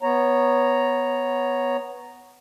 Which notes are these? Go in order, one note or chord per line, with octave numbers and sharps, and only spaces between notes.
B3 C#5 A#5